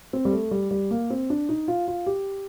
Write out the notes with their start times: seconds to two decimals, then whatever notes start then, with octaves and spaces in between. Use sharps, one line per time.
0.13 C4
0.25 G3
0.32 A3
0.51 G3
0.71 G3
0.91 A#3
1.10 C4
1.30 D4
1.49 D#4
1.68 F4
1.88 F4
2.07 G4